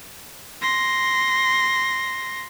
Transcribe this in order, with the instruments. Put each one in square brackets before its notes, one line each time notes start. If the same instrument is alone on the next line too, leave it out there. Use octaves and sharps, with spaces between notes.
[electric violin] C6 A#6